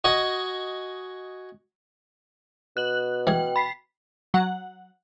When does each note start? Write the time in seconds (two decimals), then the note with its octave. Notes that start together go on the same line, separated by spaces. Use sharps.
0.04 F#4 D#5 G#5
2.77 B2 F#6 F#7
3.27 E3 G#4 G5
3.56 B5 B6 C7
4.34 F#3 F#5